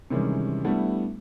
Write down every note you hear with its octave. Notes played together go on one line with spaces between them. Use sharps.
C3 D#3 E3 G3 G#3 C#4
G3 A3 B3 D4 E4